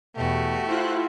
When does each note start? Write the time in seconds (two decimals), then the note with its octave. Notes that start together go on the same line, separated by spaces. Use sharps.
0.16 E2 B2 A3 F#4 G4
0.67 E4 F4 C5 F#6